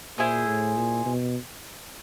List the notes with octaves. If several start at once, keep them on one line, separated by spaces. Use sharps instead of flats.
A#2 E4 G#4 C5
A2
A#2
B2